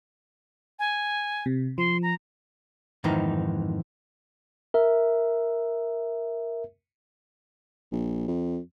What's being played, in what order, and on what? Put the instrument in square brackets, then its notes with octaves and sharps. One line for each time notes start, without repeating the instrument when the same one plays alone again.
[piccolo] G#5
[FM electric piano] C3
[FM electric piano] F3 [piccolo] C6
[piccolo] A#5
[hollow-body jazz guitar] F2 G#2 D#3 E3 D#4 A#5
[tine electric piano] A#4 E5
[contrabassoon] A#1
F2